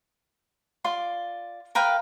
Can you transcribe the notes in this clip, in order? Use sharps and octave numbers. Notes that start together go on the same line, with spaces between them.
F4 D5 C6
A#4 B4 F5 G5